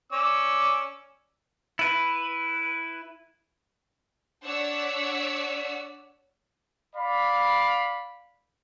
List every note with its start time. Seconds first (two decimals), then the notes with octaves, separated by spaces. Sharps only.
0.12 C#4 D5 E6
1.79 E4 B4
4.44 D4 C#5 D5 F#5 E6 B6
6.96 D5 F5 B5